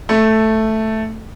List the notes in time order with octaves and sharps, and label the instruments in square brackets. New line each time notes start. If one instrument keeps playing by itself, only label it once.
[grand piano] A3